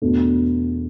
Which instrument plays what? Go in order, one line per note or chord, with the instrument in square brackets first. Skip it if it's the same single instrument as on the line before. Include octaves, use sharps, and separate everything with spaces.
[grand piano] E2 B2 A3 D4 A4